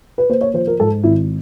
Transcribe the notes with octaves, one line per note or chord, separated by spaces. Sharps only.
B4
A#3 C5
C#5
F3 C5
A#4
G#2 A4
G#1 E4